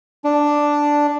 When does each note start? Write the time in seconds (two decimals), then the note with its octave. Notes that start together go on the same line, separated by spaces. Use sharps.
0.24 D4